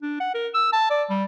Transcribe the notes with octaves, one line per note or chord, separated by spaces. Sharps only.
D4
F#5
A#4
E6
A5
D5
G3